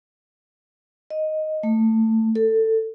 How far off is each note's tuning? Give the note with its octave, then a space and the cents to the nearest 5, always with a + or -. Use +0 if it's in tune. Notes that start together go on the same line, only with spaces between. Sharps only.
D#5 +0
A3 +20
A4 +15